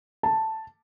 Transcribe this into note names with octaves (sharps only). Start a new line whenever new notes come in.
A5